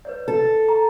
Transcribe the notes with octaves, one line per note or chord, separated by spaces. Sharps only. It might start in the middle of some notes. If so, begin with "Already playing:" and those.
B4 C#5 D5
A4
A#5